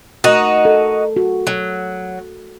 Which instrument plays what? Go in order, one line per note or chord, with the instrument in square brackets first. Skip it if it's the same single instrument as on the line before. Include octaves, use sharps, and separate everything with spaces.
[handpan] A3 A#4 [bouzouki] D#4 F#4
[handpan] A4
F#4
[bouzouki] F#3